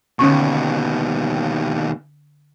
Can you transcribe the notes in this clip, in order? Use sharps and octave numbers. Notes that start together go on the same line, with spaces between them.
D#2 B2 D3 C#4 C#6